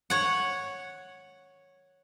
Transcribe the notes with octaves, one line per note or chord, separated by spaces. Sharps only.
C#5 F#5